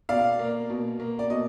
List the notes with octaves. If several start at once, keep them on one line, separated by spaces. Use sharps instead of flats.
B2 D5 F5
A#3
B2
A#3
D5
B2 D#5